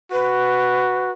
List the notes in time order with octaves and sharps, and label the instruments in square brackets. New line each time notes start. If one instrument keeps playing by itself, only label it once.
[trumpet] F#4 [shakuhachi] B4